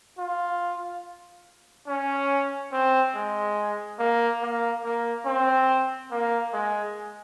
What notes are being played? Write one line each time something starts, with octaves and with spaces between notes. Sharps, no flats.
F4
C#4
C4
G#3
A#3
A#3
A#3
C4
A#3
G#3